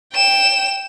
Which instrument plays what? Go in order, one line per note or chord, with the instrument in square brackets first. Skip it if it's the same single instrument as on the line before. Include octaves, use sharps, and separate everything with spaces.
[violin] G5 E7